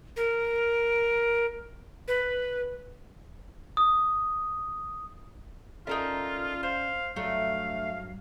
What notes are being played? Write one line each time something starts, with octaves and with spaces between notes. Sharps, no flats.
A#4
B4
D#6
C#4 D#4 F4 A4 A#4 D5 E5
C5 F5
G2 F#3 A3 D4 F5 A#5